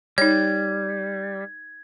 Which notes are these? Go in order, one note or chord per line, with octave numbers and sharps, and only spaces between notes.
G3 D#4 C#5 G#6